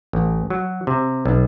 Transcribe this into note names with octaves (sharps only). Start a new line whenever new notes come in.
A1
F#3
C3
B1